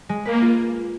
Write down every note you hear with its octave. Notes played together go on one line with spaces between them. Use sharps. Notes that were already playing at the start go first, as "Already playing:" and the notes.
G#3
A#3 B4
F4